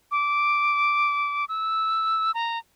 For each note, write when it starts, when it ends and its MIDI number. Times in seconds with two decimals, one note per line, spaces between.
0.11 1.45 86
1.49 2.32 88
2.34 2.59 82